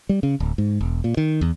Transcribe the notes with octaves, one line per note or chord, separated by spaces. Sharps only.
G3
C#3
D1
G#2
E1
A#2
D#3
E2